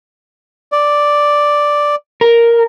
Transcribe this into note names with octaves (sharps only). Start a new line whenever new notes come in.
D5
A#4